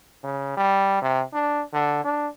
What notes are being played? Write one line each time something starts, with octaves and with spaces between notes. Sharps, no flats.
C#3
G3
C3
D4
D3
D4